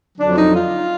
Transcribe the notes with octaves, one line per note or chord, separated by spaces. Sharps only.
F2 D3 F#3 D4
D#4
F4